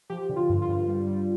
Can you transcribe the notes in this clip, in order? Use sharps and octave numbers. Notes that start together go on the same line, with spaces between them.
F3 G4
D3
F4
G2
F4
G2
G3
G3